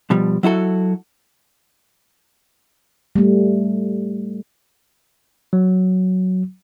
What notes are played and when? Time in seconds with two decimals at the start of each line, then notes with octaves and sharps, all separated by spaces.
0.10 B2 F3 G3
0.43 F#3 E4 F#4 A4
3.16 G3 A3
5.53 F#3